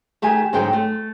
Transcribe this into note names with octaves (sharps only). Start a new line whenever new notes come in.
D#3 A3 G4 G#4 G#5
G#2 D3 F#3 G#3 C4 G5
A3